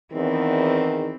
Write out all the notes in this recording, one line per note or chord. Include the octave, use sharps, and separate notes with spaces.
E2 D#3 E3 C4